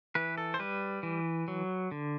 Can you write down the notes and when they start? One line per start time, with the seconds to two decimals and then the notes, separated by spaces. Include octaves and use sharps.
0.15 E3 B4
0.38 A4
0.54 C5
0.59 G3 B4
1.03 E3
1.48 F#3
1.91 D3